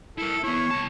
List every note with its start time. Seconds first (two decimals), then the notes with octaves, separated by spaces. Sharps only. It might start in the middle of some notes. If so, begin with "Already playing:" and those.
0.18 E4 A4 A#4
0.44 B3 E4 C#5
0.71 C2 A5